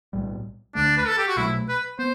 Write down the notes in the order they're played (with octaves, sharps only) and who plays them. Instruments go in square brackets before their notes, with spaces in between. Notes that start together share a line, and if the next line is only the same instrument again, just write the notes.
[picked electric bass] B1 A2 G3
[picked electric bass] D2 D3 A3 [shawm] D4
[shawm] B4
A4
G4
F#4
[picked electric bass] B1 B2 F#3 A3 [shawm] E4
[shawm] B4
[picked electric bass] B3 [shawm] C5